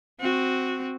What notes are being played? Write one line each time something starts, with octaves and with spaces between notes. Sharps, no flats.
C4 F#4